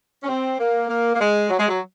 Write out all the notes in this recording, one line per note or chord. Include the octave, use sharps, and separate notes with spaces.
C#4
C4
A#3
A#3
A#3
G#3
F#3
G#3
F#3